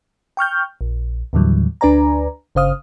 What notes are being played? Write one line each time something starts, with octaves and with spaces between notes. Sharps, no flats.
G5 C#6 F6 G6
A#1
D#2 A2 D3 E3 F#3 G3
D2 D4 B4 D5 G#5 A#5
G1 C#3 C5 F5 D#6 F6